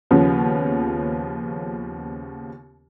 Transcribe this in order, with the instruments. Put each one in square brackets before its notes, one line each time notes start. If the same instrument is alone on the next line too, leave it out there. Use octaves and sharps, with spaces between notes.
[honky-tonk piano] D#2 C#3 F3 B3 C#4